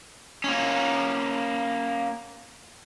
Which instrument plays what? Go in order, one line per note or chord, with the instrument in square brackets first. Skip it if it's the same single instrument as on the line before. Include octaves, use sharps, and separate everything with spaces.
[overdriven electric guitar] A#3 C#4